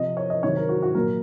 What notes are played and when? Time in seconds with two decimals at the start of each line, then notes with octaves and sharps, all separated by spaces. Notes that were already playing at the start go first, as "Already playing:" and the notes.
Already playing: C3 F3 D#5
0.17 C#5
0.30 D#5
0.43 C3 D#3 F#3 C#5
0.57 A#4
0.69 F#4
0.83 F#4
0.95 A#2 F#3 A#4